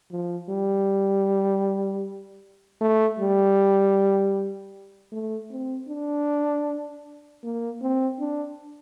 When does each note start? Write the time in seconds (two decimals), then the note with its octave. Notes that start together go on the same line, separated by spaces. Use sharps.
0.11 F3
0.50 G3
2.81 A3
3.19 G3
5.12 A3
5.51 C4
5.89 D4
7.43 A#3
7.82 C4
8.19 D4